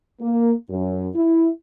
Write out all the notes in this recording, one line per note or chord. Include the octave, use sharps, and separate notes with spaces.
A#3
F#2
E4